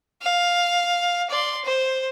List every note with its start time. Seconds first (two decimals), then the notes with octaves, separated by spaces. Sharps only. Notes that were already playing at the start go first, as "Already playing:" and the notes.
0.22 F5
1.30 D5 C6
1.65 C5